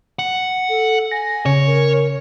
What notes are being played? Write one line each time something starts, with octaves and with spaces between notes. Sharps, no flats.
F#5
A4
G#5 A#6
C#3 C#5
A#4